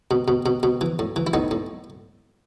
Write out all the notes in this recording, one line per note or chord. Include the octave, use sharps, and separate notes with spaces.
B2
B2
B2
B2
E3
A2
E3
E4
A2 B3 D#4
A2